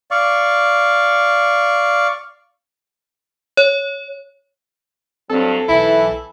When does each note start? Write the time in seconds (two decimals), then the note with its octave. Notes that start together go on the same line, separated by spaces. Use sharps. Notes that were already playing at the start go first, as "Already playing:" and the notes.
0.11 D5 F5 C#6
3.57 C#5
5.30 G2 F#3 C4 A4
5.68 B1 E3 E4